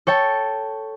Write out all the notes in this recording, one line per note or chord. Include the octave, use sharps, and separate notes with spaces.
A4 C#5 G5 A5